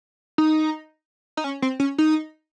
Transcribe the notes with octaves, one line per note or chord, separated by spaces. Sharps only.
D#4
D#4
C#4
C4
C#4
D#4